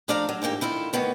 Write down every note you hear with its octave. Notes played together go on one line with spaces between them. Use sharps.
F3 A3 D4 D5 F5 A#5
F#3
G#2 E3 A#3 G4
D#3 E4 F4 A4
D2 B2 D#3 B3 C#5